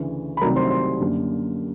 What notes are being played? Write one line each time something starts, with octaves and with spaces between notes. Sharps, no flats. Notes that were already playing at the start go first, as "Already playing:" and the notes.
Already playing: D2 C#3 E3
B5
C2 C3 D#3 F#3 A3 A#4 A#5
C5 C6
C5 C6
F#2 D3 G3 A#3